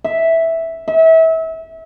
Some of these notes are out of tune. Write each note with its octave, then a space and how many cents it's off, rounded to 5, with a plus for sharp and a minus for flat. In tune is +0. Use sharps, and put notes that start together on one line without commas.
E5 -5
E5 -30